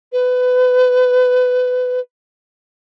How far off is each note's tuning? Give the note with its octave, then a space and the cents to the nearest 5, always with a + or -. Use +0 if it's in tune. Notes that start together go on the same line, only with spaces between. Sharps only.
B4 +25